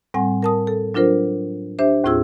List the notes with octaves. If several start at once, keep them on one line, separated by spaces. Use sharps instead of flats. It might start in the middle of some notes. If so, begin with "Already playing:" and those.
A2 G3 C4 F#5 G#5
A#4 A5 D#6
A4
F#3 D4 F4 A#4 C5
D4 G4 C5 E5
D#2 A2 C4 F4 G#4 E6